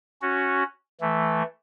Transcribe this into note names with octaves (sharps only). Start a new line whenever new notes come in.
C#4 F#4
E3 A3